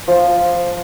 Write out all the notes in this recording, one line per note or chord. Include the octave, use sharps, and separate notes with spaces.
F3